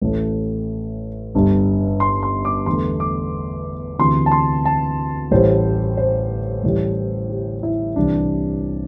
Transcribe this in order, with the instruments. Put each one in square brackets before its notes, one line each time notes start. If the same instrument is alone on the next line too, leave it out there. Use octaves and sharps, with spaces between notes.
[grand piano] A1 A2 A3
G1 G2 G3
C6
C6
D6
E2 D3 A3 C6
D6
D2 C3 E3 C6
A5
C6
A5
A1 A2 G3 C5
C5
A1 A2 E3 G3
G4
E4
C2 C3 E3 G3 D4